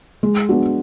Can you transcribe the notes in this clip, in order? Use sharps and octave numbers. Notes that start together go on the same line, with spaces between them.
G#3
B3 D4 F#4